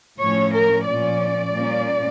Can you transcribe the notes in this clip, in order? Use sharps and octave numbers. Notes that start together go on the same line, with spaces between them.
A2 F3 C#4 C#5
A#4
A#2 F3 C#4 D5
A#2 G3 A#3 C#4